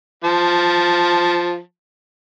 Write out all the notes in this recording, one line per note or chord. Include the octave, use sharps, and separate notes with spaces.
F3 A5